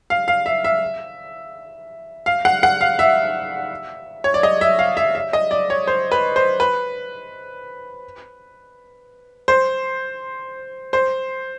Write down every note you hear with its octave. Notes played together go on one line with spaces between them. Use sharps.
F5
F5
E5
E5
F5
F#5
F#5
F5
E5
C#5
D5
D#5
E5
F5
E5
E5
D#5
D5
C#5
C5
B4
C5
B4
C5
C5